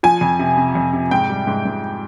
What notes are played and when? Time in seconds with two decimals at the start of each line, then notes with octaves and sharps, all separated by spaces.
0.03 F3 G#5
0.21 F2
0.39 C3
0.57 C3
0.75 F2
0.93 C3
1.11 G#2 G5
1.30 G3
1.47 G#2
1.65 G#2